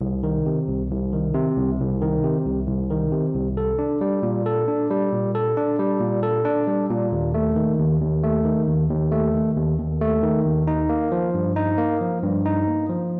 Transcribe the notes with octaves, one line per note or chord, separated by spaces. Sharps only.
C2
D#3
C3
C2
C2
D#3
C3
C2
C2
D#3
C3
C2
C2
D#3
C3
C2
A4
D4
G3
A#2
A4
D4
G3
A#2
A4
D4
G3
A#2
A4
D4
G3
A#2
D#2
A3
D#3
D#2
D#2
A3
D#3
D#2
D#2
A3
D#3
D#2
D#2
A3
D#3
D#2
D#4
A#3
F3
G2
D#4
A#3
F3
G2
D#4
A#3
F3